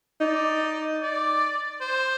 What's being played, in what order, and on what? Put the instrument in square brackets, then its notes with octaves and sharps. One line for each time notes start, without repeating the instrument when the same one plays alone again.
[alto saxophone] D#4 [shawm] D5
[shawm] D5
C5